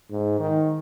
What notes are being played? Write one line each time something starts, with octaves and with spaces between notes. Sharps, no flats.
G#2
D#3